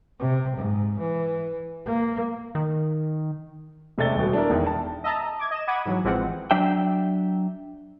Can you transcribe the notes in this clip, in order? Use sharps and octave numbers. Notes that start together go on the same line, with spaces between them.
C3
G#2
E3
A#3
D#3
E1 C3 A3 D5 A6 G7
D#1 B2
D4 E4 A#4
E1 E2 D#3
A5
D#5 E5 A5 A#5
D6 G#6
D#5 E7
F#5 B5 D6 G#6 D#7
G#2 E3 F#3
A1 E3 F3 G#3 C4 F#5
F#3 D4 E5 G5